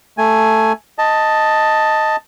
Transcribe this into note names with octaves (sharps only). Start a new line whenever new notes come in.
A3 G#5
D#5 A5